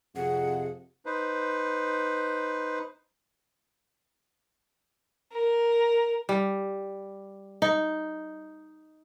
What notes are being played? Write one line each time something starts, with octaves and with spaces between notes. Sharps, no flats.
F2 C3 G#4 F#5
D#4 B4 C5
A#4
G3
D#4